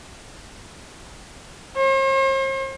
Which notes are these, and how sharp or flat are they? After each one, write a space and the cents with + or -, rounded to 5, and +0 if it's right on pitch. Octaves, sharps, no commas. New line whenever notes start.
C5 +45